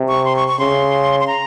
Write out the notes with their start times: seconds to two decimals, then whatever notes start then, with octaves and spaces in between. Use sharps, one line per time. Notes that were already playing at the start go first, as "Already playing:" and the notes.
Already playing: C3
0.08 C#6
0.25 C6
0.36 C#6
0.48 C#6
0.59 C#3 C6
1.20 C6
1.27 A#5